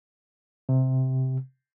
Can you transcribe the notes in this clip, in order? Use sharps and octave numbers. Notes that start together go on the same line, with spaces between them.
C3